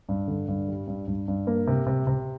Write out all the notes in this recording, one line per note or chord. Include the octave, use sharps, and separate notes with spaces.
G2
D3
G2
G3
G2
G2
G2
A#3
C3
C3
C3